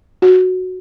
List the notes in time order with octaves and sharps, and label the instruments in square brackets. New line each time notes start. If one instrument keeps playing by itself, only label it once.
[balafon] F#4